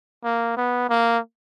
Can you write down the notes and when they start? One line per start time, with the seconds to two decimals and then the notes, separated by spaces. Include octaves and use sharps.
0.24 A#3
0.57 B3
0.89 A#3